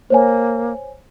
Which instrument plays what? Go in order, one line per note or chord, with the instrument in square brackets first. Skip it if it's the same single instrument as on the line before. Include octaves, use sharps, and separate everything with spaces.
[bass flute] A#3 [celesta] C5 C#5 G#5